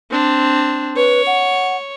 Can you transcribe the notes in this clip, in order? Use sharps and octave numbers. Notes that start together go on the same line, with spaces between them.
C4 D4
B4 C#5
F#5